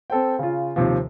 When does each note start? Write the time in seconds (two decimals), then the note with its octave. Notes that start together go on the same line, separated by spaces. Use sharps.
0.10 C4 A4 C5 G5
0.39 C#3 F4
0.76 D#2 C3 F3